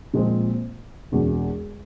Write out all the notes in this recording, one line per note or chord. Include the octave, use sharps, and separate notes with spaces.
A#2 F3 G#3 C4
E1 E2 B2